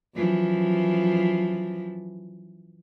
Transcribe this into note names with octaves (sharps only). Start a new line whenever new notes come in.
F#2 E3 F3